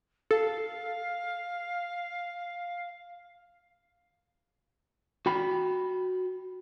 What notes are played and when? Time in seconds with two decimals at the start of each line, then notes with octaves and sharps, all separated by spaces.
0.31 A4 F5
5.26 F#4 G5 B5